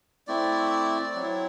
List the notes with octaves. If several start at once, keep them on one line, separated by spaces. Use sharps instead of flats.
A3 C4 E4 D5
F#3 C4 E4